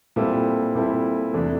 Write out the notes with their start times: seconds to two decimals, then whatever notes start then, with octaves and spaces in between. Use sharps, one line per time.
0.16 A#2 G3 C4 E4 A4
0.75 A#2 G3 C4 E4 A4
1.33 E2 C3 E3 A3 D4